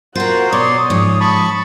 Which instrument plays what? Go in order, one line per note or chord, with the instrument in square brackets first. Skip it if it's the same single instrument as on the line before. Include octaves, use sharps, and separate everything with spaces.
[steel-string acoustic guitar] F4 F#4 [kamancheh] A#4 F#5 [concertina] C5
[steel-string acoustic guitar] B2 [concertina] C#5 D5 C6 [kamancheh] D#6
[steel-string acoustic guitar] G#2 F3 [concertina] C#5
[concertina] A5 B5 C#6